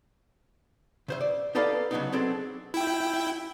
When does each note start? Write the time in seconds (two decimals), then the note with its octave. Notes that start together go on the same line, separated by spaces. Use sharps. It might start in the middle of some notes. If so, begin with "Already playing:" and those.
1.08 C#3 C5 E5
1.21 D5
1.55 D#4 G4 A4 B4 D5 F5
1.91 C#3 F#3 A#3 B3 D4 D#4
2.12 F#3 C4 D4 G#4 A4
2.74 E4 G5